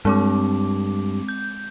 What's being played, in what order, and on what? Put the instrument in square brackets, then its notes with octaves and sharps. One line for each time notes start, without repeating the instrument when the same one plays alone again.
[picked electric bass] G2 [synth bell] G#3 C4 D6
[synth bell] G6